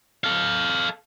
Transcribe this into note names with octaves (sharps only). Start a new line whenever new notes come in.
A4 F5